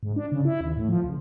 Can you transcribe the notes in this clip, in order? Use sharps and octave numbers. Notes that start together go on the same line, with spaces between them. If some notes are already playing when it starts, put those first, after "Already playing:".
G#2
D4
C#3
E4
D#2
A2
F3
C#2